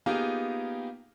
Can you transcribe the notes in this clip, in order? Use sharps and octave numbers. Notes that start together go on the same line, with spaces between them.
A#3 B3 D#4 F4 G4 G#4